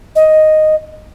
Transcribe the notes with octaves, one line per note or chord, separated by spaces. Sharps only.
D#5